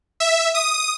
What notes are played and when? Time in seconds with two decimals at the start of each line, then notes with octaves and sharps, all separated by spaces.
0.20 E5
0.55 D#6